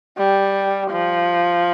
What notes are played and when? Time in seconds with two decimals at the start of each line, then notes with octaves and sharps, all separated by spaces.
0.18 G3
0.90 F3